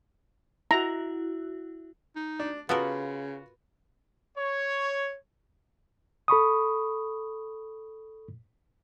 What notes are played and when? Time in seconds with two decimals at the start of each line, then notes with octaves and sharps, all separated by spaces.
0.71 E4 F#4 A#5
2.16 D#4
2.40 D4
2.69 C#3 B3 F4 F#4 A4 A#4 B5
4.37 C#5
6.28 A4 B5 C#6 D#6